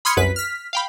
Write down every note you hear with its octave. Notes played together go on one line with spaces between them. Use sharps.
B5 C6 D#6 F6 G#6 C#7
C2 F#2 B4 B6
F6 B6
F5 G5 B5